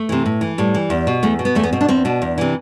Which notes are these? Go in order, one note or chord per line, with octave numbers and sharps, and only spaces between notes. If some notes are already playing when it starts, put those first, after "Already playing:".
Already playing: A3
C3 E3
A2
E3
A2 G3
E3
E2
B2
E2 A3
B2
B3
E2 A3
B3
B2 C4
D4
E2 C4
B2 D4
E2
C3 E3